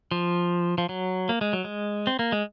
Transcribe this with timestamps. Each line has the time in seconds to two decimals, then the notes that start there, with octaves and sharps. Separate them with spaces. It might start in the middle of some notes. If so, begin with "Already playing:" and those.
0.11 F3
0.78 F3
0.89 F#3
1.29 A#3
1.41 G#3
1.53 F#3
1.64 G#3
2.07 C4
2.19 A#3
2.32 G#3